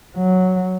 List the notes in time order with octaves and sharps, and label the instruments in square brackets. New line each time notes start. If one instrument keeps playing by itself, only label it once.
[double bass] F#3